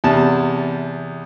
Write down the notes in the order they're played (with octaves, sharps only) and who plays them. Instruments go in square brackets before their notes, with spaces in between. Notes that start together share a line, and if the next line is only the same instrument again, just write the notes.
[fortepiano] E2 C3 A5